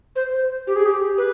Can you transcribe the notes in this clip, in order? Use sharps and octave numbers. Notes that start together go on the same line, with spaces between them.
C5
G4
G#4
G4
B4